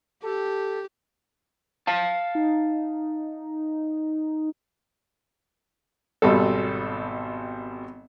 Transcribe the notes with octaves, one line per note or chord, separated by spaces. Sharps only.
G4 A4
F5 A5
D#4
G#1 B2 G3 A4